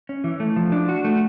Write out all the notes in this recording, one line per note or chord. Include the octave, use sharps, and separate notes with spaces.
C#4
E3
A3
F3
D4
F#4
A3